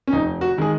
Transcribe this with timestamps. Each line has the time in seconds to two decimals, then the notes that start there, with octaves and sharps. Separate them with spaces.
0.07 C#4
0.13 F1 D#4
0.41 F#4
0.58 D#3 G#3 G#4